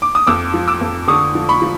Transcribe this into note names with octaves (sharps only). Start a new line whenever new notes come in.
D6
D#6
F2 D6 E6
F3
D6 E6
F2
D3 C#6 D#6
F3
B5 C#6
F3